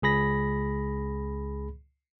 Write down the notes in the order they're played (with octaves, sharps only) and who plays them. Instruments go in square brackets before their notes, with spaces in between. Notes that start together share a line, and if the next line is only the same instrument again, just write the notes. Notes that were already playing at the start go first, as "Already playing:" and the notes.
[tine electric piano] C#2 G#4 B5 A#6